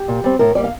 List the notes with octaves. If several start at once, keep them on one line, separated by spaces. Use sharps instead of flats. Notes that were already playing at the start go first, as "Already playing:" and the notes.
Already playing: G4
A#2
G3 C4
A2 A#4
G3 A#3 D5
F5